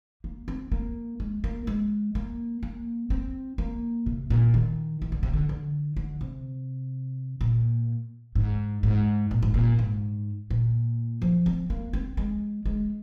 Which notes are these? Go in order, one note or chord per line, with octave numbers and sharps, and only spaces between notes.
A#3
C4
A#3
G#3
A#3
G#3
A#3
A#3
C4
A#3
C3
A#2
D#3
D#3
D3
C3
D3
D3
D3
C3
A#2
G#2
G#2
A#2
G#2
A#2
G#2
A#2
F3
C4
A#3
C4
G#3
G#3